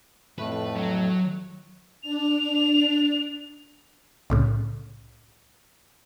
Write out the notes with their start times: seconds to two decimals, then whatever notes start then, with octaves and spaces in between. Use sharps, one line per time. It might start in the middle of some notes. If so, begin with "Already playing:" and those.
0.39 F2 A2 A3 B4
0.76 F#3
2.03 D4 F7
4.30 C2 A2 C#3